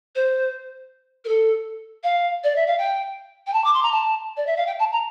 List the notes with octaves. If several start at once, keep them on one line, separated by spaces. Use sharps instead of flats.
C5
A#4
A4
F5
D5
E5
F5
G5
G5
A5
D6
C6
A#5
A5
D5
E5
F5
G5
A5
A#5